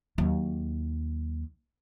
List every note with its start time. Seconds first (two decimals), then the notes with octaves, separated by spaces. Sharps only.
0.18 D#2 F#3